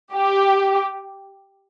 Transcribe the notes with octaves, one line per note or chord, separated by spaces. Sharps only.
G4